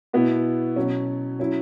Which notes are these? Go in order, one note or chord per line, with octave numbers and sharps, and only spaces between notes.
B2 B3 E4
B2 F#3 C#4
F#3 C#4 E4